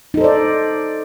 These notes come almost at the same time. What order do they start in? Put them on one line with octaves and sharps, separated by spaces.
D#4 A4 C5 D5